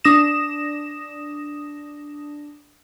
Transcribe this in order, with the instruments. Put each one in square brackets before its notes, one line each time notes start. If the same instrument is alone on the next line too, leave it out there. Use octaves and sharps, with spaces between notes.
[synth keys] D4 D#6 A#6 E7